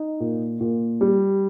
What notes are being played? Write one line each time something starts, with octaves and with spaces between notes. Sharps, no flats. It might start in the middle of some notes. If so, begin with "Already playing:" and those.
Already playing: D#4
A#2
A#2
G3